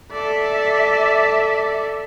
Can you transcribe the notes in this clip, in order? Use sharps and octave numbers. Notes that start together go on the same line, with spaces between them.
A4 D5 E5